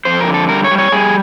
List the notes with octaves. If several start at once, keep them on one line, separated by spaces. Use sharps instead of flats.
F2 C5
A#4
D3
A4
G3 A#4
C#5
G3
C#5
G3 G#4